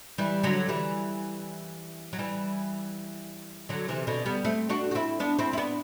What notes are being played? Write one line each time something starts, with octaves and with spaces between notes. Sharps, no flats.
E3 G3
D3 F#3
E3 G3
F#3
E3 G3
D3 F#3
C3 E3
B2 D3
G3 B3
A3 C4
D4 F#4
F#4
C4 E4
B3 D4
C4 E4
E4
B3 D4